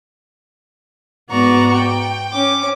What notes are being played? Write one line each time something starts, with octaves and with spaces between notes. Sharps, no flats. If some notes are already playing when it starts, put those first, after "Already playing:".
G#2 B3 F#4 D5 A#5 C#6
G5
C#4 D6